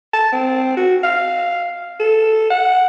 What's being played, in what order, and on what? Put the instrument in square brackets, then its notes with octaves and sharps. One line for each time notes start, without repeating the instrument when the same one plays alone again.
[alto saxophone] A5
C4
F#4
F5
A4
F#5